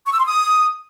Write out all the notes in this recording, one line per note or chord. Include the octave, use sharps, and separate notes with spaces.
C#6
E6
C6
D#6